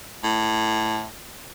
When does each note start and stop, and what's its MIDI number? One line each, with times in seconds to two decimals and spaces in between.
0.24 1.06 45